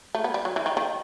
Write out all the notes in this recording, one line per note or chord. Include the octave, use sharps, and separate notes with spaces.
A3
B3
G3
F#3
E3
D#3
D#3